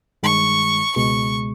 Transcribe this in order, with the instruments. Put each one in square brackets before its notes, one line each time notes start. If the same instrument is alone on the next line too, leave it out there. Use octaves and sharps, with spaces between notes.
[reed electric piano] G2 D#3 G#3 [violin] C#6
[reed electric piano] C#2 B2 G#3 [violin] C#6